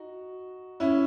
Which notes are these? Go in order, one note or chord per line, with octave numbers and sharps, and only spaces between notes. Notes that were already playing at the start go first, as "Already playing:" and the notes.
Already playing: D#4 F#4
C#4 E4